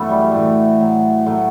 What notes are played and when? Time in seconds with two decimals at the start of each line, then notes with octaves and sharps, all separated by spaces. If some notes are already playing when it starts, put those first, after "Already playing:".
Already playing: F#2 E3 A3 B3
0.09 G3
0.32 A2 E3 A3
0.80 A2 F#3
1.26 A2 F#3 A3